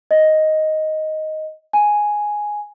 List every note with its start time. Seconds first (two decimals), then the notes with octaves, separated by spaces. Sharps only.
0.11 D#5
1.73 G#5